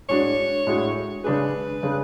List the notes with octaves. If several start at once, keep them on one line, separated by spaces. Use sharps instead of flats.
A2 G#3 D4 F#4 C#5
A2 G#3 D4 F#4
C#3 G#3 D4 G#4 B4
C#3 G#3 D4 G#4